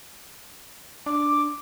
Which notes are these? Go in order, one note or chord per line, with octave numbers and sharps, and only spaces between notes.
D4 D6